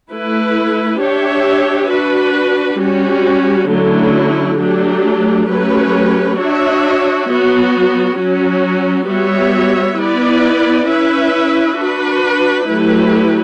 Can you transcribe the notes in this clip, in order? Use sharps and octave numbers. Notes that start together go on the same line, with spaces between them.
A3 E4 B4
D4 G4 C#5 E5
D4 F#4 B4
G3 C#4 F#4
D3 F#3 A3 C#4 E4
F#3 A3 D4 G4
F#3 A3 C#4 G4 B4
D4 F#4 C#5 E5
F#3 B3 F#4
F#3 C#4 F#4
G3 B3 F#4 C#5 E5
B3 E4 B4 D5
C#4 E4 B4 E5
D4 F#4 B4
F#3 A3 E4 G4 B4